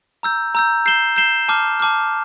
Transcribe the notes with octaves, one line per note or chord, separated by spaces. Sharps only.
A#5 E6 G6
A#5 E6 G6
G6 C7 E7 G7
G6 C7 E7 G7
A5 D6 F6
A5 D6 F6